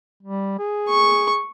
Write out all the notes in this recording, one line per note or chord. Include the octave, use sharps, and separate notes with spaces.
G3
G#4
C#6